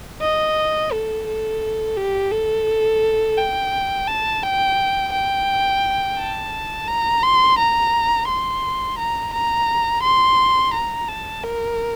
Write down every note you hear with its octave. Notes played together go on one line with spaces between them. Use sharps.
D#5
A4
A4
G4
A4
G5
A5
G5
G5
A5
A#5
C6
A#5
C6
A#5
A#5
C6
A#5
A5
A#4